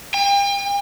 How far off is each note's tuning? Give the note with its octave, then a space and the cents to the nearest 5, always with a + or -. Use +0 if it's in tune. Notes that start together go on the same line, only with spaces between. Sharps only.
G5 +40